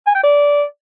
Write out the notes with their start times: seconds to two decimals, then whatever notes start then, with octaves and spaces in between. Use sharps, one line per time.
0.07 G#5
0.15 G5
0.24 D5